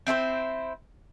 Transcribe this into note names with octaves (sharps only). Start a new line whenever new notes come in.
C4 E4 G#4 C5